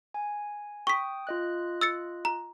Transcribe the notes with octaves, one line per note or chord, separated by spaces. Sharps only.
G#5
G5 C#6 D#6 B6
F4 D#5 F#6
E6 A6 C#7
A#5